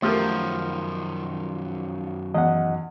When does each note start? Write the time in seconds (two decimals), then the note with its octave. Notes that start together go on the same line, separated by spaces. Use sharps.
0.02 F#2 D#3 F3 A3 G4 A#4
2.34 E2 D#5 F#5